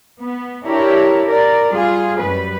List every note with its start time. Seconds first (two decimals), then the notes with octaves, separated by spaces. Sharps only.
0.20 B3
0.66 D4 E4 G4 A#4 C#5
1.26 A#4 D5
1.69 G3 F4 G#4
2.20 F#2 G3 B4